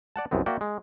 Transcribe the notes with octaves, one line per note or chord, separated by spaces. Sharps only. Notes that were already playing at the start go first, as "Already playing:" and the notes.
D5 F#5 A5
C2 F#2 B3 C4
A#3 F#4 D5 E5 G5
G#3